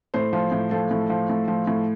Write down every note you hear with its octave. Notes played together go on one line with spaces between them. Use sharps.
A2 C5
F3
A2
F3 A4
A2
F3
A2
F3
A2